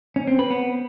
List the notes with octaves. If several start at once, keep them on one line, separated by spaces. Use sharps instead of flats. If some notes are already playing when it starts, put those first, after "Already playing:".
C#4
C4
B4
B3